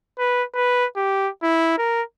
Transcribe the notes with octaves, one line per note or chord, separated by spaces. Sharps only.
B4
B4
G4
E4
A#4